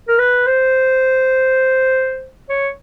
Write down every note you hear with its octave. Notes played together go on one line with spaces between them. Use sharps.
A#4
B4
C5
C#5